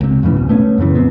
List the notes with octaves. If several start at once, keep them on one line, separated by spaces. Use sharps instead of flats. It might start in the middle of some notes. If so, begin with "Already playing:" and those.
C#2 C3
F2 A2 C#3 E3
D2 B2
A3 B3 C#4
F#2 A#2 C#3 E3
F2 B3 C4